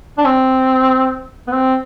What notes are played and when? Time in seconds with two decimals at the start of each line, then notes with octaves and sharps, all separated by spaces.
0.18 D4
0.25 C4
1.48 B3
1.52 C4